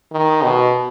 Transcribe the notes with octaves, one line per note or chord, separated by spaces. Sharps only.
D#3
B2